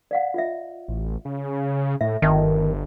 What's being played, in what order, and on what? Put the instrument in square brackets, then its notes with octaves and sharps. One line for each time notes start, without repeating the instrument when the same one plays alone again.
[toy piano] D5 F5 F#5
F4 D#5 E5
[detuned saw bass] A1
C#3
[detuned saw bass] A2 [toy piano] E5
[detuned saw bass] G1 [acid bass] D#3 [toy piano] D#5 E5 A5